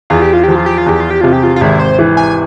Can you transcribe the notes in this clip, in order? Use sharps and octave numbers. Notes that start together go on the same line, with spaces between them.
E2 F4
G4
F4
F3 G4
F4
G4
F4
E2 G4
F4
G4
C3 F4
G4
F4
F4
G#1 E4
C5
E3
G#5